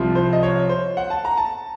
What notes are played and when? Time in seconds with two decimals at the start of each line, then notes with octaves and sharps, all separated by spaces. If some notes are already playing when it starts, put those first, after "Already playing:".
Already playing: C2 C3 F3
0.15 C5
0.33 D#5
0.43 C#5
0.69 C5
0.97 F#5
1.10 A5
1.25 A#5
1.37 A5